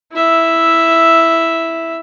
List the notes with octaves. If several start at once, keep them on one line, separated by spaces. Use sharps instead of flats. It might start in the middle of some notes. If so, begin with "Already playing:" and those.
E4 E5